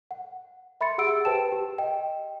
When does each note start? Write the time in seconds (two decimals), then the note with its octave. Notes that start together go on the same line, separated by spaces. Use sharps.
0.11 F#5
0.81 E5 B5 C6 A6 C#7
0.98 G4 G#4 F#5 E6 D7
1.25 G4 B4 C5 G5 A5 E7
1.52 G4
1.78 D#5 G5